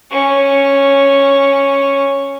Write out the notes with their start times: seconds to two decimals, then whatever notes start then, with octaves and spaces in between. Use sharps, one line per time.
0.11 C#4 C#6